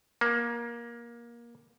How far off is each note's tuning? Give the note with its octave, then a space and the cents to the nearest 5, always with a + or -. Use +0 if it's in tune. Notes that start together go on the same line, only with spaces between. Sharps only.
A#3 +20